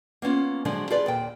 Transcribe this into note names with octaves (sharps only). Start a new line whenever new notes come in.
A#3 B3 C#4 F4
D3 F3 F#3 G#3 D4 G#5
F4 G#4 A4 B4 D5
D#2 A#2 G5